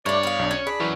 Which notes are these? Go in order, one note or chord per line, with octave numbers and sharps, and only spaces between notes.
G2 A3 D4 C#5 D5
B3 F5
B1 D4
C#4 G#6
D4 G#4 B5
E3 F#3 C#4